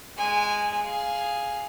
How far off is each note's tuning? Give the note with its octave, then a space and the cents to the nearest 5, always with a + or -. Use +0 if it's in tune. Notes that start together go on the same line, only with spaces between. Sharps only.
G#3 +0 G#5 -15
G#4 +0 F5 +0